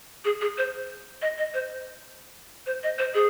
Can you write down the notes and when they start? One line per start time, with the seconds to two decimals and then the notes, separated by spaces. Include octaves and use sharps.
0.25 G#4
0.41 G#4
0.58 C5
1.22 D#5
1.38 D#5
1.54 C5
2.66 C5
2.83 D#5
2.98 C5
3.15 G#4